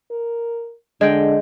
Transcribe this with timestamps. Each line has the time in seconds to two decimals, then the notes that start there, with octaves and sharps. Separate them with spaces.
0.11 A#4
1.01 D3 G#3 G5